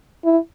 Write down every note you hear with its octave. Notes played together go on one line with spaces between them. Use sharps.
E4